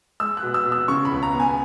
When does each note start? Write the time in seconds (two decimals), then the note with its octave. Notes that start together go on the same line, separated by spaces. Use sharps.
0.20 G#3 E6
0.37 F#6
0.43 B2
0.54 E6
0.65 B2
0.72 E6
0.88 C#3 C#6
1.05 B5
1.11 C#2
1.23 A#5
1.34 B3
1.40 G#5